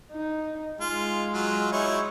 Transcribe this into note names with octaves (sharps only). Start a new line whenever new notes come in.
D#4
G#3 F4
F#3 F4
D#4 E4 C#5